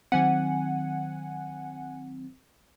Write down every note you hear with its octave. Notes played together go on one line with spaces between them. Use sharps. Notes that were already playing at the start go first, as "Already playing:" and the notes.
D#3 F#3 C4 F#5 G#5